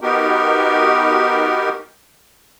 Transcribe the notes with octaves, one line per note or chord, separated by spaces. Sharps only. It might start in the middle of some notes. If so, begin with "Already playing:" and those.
B3 D#4 F#4 G4 A#4